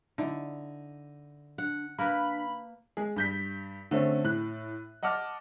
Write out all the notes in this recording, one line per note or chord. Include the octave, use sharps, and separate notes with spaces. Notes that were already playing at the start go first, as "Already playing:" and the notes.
D3 D#4 E4
D4 F#5
A#3 D4 A#4 B4 B5
G#3 G#4
G2 G6 B6
D3 A3 C4 C#4
A2 F#6
D#5 F#5 A5 D6 F6